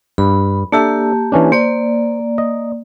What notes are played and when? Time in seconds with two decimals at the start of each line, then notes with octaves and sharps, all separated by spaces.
0.18 G2 B5
0.72 A#3 D4 G4 A4 E5 A5
1.32 E3 C#4 D4
1.52 A#3 C5 D5
2.38 D#5